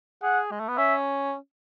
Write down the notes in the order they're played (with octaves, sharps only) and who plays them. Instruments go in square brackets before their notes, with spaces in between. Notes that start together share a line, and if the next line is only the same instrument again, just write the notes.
[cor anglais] G#4 [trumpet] F#5
[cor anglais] G#3
A3
B3
[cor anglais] C#4 [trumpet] E5